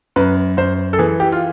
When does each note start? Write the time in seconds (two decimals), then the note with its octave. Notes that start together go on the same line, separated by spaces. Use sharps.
0.16 F#2 B4
0.57 F#2 C5
0.93 A4
0.98 E3 G#4
1.20 G4
1.32 F4